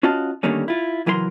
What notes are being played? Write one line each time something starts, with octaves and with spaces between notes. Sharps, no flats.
C#4 F4 F#4 D#5 F5 A5
D3 D#3 G3 A3 A#3 C#4
E4 F4
C#2 E3 F#3 A#4 C#5 C6